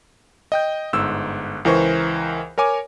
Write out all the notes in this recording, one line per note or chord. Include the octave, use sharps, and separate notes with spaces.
D#5 G5 G6
G1 G#2 E6
C#2 E3 A#4 C5 C#6
A#4 C#5 G#5 D6